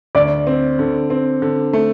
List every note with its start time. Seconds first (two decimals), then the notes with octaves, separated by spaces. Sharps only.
0.15 D2 D5
0.47 C4
0.79 D3
1.10 C4
1.42 D3
1.73 A3